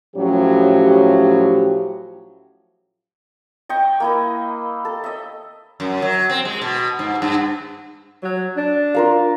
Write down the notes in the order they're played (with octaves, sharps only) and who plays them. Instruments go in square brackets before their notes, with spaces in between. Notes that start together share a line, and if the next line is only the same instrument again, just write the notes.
[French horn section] A2 F3 F#3 C#4 G4
[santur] D#5 G5 C#6
A#3 E4 D#5
A4
D#5 E5
[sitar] F#2
F#3
C4
G#3
B2
G#2
G2
[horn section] F#3
D4
[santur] F4 A#4 F5